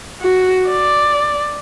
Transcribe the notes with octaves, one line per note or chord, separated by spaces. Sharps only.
F#4
D5